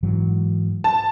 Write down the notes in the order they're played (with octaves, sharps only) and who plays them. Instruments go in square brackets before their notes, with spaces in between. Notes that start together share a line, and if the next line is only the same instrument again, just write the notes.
[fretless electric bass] G#2 E3 F#3
[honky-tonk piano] A5